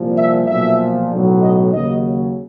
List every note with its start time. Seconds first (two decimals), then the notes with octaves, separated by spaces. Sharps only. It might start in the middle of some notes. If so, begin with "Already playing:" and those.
Already playing: C2 A#2 F3
0.16 E5
0.47 B1 A#2 F3 E5
1.10 B1 A2 F#3
1.42 D#5
1.72 D#2 C#3 F#3 D#5